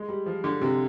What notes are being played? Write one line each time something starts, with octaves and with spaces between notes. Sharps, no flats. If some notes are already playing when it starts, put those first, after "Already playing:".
Already playing: G#3
G3
F3
D3
C3